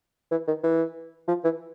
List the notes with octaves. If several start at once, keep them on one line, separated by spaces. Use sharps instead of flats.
E3
D#3
E3
F3
E3